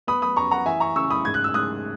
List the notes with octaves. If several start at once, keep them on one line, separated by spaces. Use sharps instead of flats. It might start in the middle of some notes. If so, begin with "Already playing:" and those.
B3 B5 D#6
B5 D#6
F#2 A#5 C#6
F#5 A#5
E3 E5 G#5
A#5 C#6
C#3 C#6 E6
B5 D#6
G#2 G#6
F#6
E6
G#2 D#6 F#6